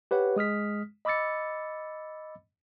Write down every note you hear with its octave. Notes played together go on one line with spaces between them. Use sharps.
G4 B4 C#5 F#5
G#3 D#6 F6 B6
D#5 B5 D6 E6 A6 C#7